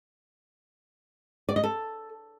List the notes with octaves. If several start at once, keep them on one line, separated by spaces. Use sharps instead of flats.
D5
D#5
A4